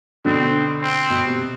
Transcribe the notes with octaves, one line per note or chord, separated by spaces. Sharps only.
B2 D3 C4
C4
B2
C3